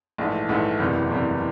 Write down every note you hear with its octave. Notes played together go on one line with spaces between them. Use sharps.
A#1 G#2 E3 A3
A#1 G#2 E3 A3
F#1 E2 C3 E3 G3
F#1 E2 C3 E3 G3